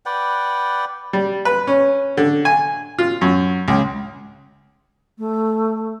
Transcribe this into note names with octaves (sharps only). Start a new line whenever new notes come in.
B4 D5 F#5 G5
G3
B4
C#4
D3
G#5
F4
F#2
C#2
A3